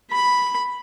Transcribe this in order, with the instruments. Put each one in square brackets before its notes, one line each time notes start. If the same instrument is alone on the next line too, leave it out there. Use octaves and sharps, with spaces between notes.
[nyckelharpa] B5